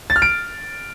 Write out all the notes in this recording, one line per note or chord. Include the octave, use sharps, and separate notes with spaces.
A6
F6
D7